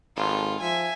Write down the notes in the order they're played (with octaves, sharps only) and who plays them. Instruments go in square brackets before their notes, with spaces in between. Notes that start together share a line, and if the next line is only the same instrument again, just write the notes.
[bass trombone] G#1 [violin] F4 A4
[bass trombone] F3 [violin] E5 G#5